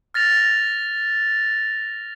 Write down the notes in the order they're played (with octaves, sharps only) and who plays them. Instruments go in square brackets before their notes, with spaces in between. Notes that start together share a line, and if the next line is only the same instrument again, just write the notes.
[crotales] F6 A6 A#6 F7